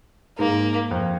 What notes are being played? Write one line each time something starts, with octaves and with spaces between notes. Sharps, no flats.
G#2 A#3
F2